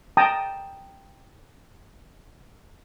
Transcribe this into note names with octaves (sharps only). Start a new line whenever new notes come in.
G5 A5 A#5 D#6